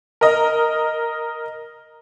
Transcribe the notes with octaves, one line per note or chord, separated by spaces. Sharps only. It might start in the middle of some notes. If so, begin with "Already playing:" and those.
A#4 D#5